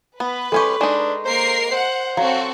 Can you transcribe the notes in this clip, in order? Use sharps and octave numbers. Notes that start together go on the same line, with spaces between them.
B3 B4
G#3 C#4 G4 A4 C#6
G#3 D4 D#4
A#3 A#4 C5 C7
C5 F#5
F#3 C4 F#4 A4 F5